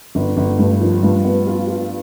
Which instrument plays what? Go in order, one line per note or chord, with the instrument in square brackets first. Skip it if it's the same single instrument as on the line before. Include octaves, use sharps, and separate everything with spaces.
[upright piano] G1
G1
G2
F3
G2
B3
F4
F4